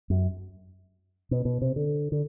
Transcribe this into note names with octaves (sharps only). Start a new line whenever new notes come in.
F#2
B2
B2
C3
D3
D3